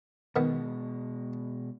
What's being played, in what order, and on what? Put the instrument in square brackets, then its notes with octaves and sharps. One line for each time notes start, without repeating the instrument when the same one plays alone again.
[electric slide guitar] B2 G#3 [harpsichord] D#3 B3